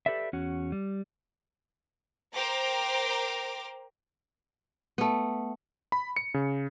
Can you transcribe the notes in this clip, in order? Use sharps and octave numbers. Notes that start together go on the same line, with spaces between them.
G4 A4 B4 D5 E5
E2 C#4 F#4
G3
A#4 C5 G5 A#5 D6
A3 B3
B5
C#7
C#3